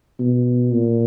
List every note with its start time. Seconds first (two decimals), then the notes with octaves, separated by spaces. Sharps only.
0.20 B2
0.74 A#2